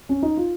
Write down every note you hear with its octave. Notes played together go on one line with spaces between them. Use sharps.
C#4
D#4
F4